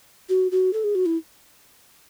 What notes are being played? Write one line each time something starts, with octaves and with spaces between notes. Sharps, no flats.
F#4
F#4
A4
G#4
F#4
E4